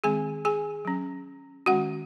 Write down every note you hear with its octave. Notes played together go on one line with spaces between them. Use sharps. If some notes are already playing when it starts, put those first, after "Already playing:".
D#3 G#3 C4 G#4 G#5
G#4 G#5
F#3 C#4
D#3 G#3 C#4 F#4 F#5